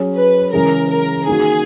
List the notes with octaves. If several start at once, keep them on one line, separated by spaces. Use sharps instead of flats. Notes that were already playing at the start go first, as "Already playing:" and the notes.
Already playing: F#3 C#4 G#4
B4
C#3 E3 G#3 C#4 G#4 A#4
A#4
D#3 A#3 D#4 F#4 G#4